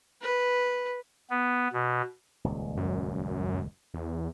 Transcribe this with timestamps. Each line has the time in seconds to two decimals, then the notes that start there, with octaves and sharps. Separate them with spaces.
0.22 B4
1.30 B3
1.73 B2
2.44 D#1 C#2
2.77 F#2
3.94 E2